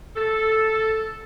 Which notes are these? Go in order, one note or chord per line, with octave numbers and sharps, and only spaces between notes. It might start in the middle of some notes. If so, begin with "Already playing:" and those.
A4